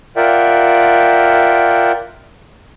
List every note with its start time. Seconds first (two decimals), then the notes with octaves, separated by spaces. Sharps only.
0.16 F4 A#4 D5 E5 F#5 G5